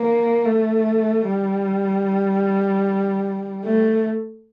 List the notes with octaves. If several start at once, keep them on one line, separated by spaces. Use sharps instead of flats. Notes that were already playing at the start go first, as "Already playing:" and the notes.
Already playing: A#3
A3
G3
A3